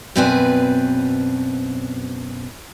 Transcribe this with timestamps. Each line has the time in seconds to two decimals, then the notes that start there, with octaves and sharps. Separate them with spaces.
0.16 F#2 B2 C4 B4 D5 G#5